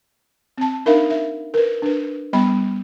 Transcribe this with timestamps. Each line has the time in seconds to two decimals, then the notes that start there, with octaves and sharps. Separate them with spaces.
0.58 C4 A5
0.86 D4 D#4 A#4 E5 F5 B5
1.10 E5
1.54 A#4 B4
1.82 D4 B4
2.33 G3 B3 B5